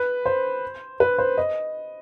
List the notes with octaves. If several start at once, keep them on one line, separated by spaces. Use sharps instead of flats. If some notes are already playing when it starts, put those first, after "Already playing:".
Already playing: B4
C5
B4
C5
D#5